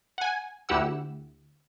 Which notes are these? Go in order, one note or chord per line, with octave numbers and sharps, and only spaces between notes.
F#5 G#5
D2 E4 G4 F#5 E6